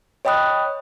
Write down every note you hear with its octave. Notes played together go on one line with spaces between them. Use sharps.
C#5 D#5 G5 B5 D#6 F#6